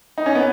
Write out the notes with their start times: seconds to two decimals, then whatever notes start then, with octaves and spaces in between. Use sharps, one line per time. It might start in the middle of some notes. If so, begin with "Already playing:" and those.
0.18 D#4
0.26 C#4
0.35 B3